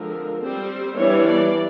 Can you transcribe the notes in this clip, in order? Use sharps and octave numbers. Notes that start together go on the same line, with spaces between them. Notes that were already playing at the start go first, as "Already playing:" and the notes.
Already playing: D3 F3 G#3 C4 A#4
G3 C4 C5
E3 G3 B3 D4 C#5
D5